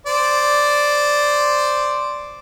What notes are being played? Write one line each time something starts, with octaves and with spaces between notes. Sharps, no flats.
C5 D5